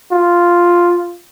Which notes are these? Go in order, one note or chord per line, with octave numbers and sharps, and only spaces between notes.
F4